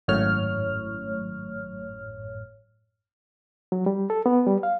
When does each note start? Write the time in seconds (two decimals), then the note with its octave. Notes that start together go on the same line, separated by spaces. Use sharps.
0.08 G#1 F#2 A2 C#5 F6
3.72 F#3
3.86 G3
4.10 A4
4.26 B3
4.47 G3
4.63 F5